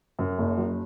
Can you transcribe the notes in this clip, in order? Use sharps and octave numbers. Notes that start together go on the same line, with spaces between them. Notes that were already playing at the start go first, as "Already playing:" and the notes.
F#2
F#1
F#3